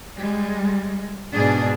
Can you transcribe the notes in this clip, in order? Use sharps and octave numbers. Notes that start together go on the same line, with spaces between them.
G3 G#3
G#2 B2 D4 G#4